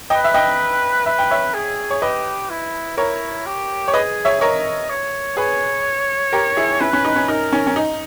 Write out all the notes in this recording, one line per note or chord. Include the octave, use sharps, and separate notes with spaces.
B4 D#5 G5
E5
D#5 G5
B4 E5
G5
C#5 E5
G#4
C#5
G4 B4 D#5
E4
E4 A#4 C#5
G4
C#5
G#4 B4 D#5
C#5 E5
A#4 C#5 D#5
C#5
G#4 B4 C#5
G4 A#4
E4 G#4
C#4 E4 B4
C#4
D#4
C#4
D#4 A#4
C#4
C#4
D#4